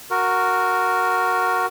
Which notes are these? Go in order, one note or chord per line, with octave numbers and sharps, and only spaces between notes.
F#4 A#4